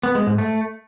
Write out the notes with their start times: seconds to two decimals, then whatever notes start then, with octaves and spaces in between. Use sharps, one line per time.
0.03 B3
0.15 G#3
0.27 G#2
0.38 A3